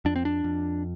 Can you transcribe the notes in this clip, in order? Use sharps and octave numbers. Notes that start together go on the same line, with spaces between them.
F2 D4
C4
D4
F2